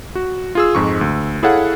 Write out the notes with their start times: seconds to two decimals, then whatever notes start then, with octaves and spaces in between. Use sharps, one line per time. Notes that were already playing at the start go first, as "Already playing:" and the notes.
0.15 F#4
0.55 F4 G#4 E6
0.75 F2 G#2 G#3 C#6
1.01 D2
1.43 E4 G#4 A4 C#5 F5 F#5